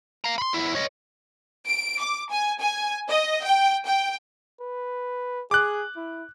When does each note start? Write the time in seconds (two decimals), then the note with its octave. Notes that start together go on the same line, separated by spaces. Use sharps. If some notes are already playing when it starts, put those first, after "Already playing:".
0.24 F5 A#5
0.38 B5 C6
0.53 E2 E4
0.75 C#5 D#5
1.67 D7
2.01 D6
2.31 G#5
2.61 G#5
3.09 D#5
3.45 G5
3.86 G5
4.61 B4
5.51 G#4 D6 F#6
5.96 E4